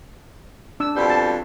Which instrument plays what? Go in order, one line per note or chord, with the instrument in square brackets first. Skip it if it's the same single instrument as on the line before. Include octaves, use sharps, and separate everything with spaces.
[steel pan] D4 E6
[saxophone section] F2 B2 G3
[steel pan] A5